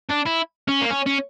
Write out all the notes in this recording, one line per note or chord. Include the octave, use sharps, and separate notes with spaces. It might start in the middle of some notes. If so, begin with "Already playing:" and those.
D4
E4
C#4
A#3
C#4
C#4